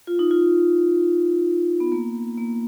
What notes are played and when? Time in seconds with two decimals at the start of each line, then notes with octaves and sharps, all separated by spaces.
0.07 F4
0.19 D#4
0.31 F4
1.80 B3
1.92 A#3
2.38 A#3